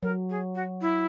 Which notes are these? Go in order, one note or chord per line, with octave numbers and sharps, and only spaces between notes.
F#3 A#4
G#4
F#4
E4